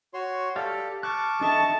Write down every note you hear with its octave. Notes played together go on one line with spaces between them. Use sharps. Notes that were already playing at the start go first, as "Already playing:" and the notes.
F#4 C#5 C6
G4 A4 D5 F5
A5 C#6 D6 F6 F#6
D4 A4 D#5 E5 A5 C#6